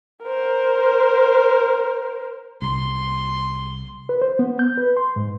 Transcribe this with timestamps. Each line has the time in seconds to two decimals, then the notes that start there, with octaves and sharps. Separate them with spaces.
0.23 A#4 C5
2.62 C2 C6
4.09 B4
4.22 C5
4.39 B3
4.59 G6
4.78 B4
4.97 C6
5.16 G#2